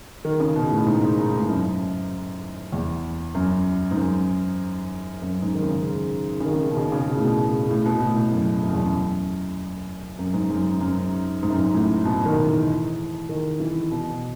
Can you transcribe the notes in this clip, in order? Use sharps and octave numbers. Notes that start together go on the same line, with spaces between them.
D#3
C#3
B2
A2
G#2
A2
G#2
F#2
E2
F#2
G#2
F#2
F#2
G#2
D#3
C#3
C#3
D#3
C#3
D#3
B2
C#3
C#3
B2
A2
B2
A2
B2
A2
A2
F#2
F#2
E2
F#2
F#2
G#2
F#2
F#2
G#2
F#2
G#2
A2
B2
D#3
E3
D#3
E3
B2